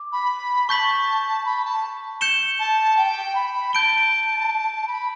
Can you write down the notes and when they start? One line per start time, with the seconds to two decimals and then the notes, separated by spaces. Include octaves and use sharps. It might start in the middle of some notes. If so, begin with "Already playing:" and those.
Already playing: D6
0.12 B5
0.68 A5 C#6 G6 B6 F#7
1.45 B5
1.65 A5
2.21 G6 C#7 E7 G7
2.59 A5
2.97 G5
3.35 B5
3.73 A5 G6 D7 G7
4.87 B5